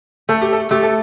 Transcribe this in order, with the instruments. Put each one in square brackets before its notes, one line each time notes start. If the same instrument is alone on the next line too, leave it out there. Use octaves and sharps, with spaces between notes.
[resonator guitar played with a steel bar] A3 [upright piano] A4
[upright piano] G4
A4
[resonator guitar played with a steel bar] A3 [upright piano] G4
[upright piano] A4